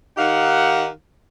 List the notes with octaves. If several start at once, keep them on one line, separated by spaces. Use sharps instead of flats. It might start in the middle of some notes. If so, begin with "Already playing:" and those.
D#3 D#4 G4 F5 F#5